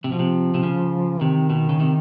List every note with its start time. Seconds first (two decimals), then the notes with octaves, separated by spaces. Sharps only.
0.04 C3 F3
0.12 B2
0.19 C3
0.54 C3
0.63 C#3
1.21 C3 D#3
1.50 B2
1.69 C#3
1.80 C3